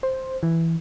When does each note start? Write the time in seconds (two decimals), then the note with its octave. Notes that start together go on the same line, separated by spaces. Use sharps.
0.03 C5
0.43 E3